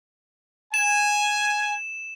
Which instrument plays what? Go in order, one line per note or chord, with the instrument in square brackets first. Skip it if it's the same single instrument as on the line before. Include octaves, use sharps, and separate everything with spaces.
[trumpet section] G#5 [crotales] E7